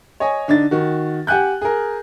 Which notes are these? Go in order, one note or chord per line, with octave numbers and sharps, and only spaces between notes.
C#5 D#5 G#5
D3 D4 D#4 A6
D#3 F#4
G4 F#5 G#5 F#6 G6
G#4 A#4